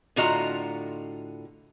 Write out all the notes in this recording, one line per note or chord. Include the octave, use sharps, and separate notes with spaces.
A2 D3 F4 F#4 D#5 A#5